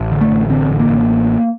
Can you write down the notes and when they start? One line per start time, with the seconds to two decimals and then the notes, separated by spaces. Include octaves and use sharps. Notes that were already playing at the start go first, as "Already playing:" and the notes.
Already playing: A1
0.12 D3
0.21 A3
0.31 A1
0.50 D3 C4
0.70 A1
0.80 A#3
0.89 A1